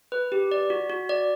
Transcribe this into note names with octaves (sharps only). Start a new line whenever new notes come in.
B4
G4
D5
F#4
F#4
D5